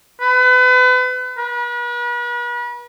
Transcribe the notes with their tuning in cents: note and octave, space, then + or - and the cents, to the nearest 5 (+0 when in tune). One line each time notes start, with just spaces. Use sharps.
B4 +35
B4 -40